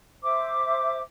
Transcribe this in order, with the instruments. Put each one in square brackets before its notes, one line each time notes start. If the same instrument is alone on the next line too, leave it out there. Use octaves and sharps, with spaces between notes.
[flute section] C5 E5 D6